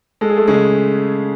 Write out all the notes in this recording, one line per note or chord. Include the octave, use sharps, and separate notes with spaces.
G#3 A4
G#4
A3 A4
C#3 G#3 G#4